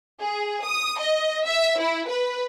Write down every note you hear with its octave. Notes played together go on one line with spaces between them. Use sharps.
G#4
D#6
D#5
E5
E4
B4